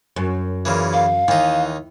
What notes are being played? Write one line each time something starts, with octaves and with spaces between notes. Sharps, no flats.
F#2
A#2 C#3 E3
F5
D#2 E3 D#4